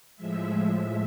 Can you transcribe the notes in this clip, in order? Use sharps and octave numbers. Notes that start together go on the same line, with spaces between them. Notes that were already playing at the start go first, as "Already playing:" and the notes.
A2 F3 G#3 E5